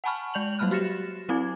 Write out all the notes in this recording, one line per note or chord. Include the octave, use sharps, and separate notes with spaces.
F#5 G#5 A5 B5 C#6 F6
G#3 D5 G6 F7 F#7
F#3 G3 A#3 B5 F6 F#6
F#4 G4 A6 A#6 C#7 E7
F#3 C4 E4 G#5 D6 G#6